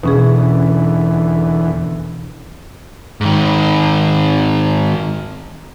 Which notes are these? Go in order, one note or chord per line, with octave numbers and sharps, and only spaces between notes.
E2 B2 D3 E3 C#4 G#4
G#2 D#3